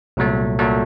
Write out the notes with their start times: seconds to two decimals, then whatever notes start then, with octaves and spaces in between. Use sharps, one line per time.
0.17 C2 A#2 F#3 A3
0.59 A#2 F#3 A3